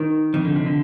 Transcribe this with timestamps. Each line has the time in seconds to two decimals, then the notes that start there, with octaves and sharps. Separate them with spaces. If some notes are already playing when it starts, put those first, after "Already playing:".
Already playing: D#3
0.34 F2 D#3
0.45 D3
0.56 C3
0.66 D3